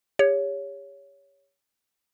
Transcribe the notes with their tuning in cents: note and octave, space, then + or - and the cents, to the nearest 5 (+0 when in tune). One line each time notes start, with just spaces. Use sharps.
G4 +40 C#5 +15